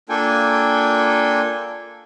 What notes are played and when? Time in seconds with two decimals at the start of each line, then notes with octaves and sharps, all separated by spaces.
0.09 A#3 D4 F4 A4 G5 G#5